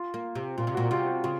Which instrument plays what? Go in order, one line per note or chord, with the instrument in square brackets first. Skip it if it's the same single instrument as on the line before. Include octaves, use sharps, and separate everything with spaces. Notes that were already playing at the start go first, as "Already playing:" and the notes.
Already playing: [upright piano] F4
[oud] A#3
C3
[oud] A#2 [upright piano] F4
[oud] C3
[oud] A#2 [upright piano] F#4
[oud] C3 [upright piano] F4
[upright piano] F#4
[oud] C#3 [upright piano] F4